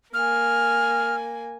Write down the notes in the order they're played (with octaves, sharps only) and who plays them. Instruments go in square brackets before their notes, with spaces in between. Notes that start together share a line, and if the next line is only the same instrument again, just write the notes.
[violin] A#3 G#5 [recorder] F6